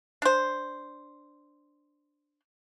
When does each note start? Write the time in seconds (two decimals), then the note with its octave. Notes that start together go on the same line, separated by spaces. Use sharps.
0.22 D4 C5